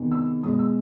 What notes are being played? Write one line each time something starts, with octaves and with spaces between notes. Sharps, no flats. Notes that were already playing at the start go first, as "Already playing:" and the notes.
Already playing: E2 C3 D#3
E6
E2 B2 G#3 D#6
E6